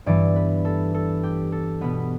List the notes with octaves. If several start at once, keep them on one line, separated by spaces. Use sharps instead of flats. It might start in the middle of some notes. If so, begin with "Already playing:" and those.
G2 E3 B3 D5
B4
A4
A4
G4
A4
B2 B3 B4